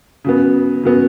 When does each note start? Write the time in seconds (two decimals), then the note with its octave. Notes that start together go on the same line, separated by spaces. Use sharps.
0.24 C#3 F#3 B3
0.83 C#3 F#3 B3